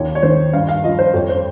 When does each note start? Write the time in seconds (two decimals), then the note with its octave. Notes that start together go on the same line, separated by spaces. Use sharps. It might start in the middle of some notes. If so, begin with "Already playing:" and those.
Already playing: D#2 C#5
0.15 C#5
0.23 D#3 C5
0.53 G2 F5
0.69 F5
0.84 F3 D#5
0.99 C5
1.14 F2 C#5
1.29 C5